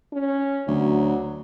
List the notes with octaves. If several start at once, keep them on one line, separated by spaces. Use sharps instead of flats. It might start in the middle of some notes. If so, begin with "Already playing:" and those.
C#4
D2 F#3